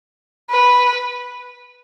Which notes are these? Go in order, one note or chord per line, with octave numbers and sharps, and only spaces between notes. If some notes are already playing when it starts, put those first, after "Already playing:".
B4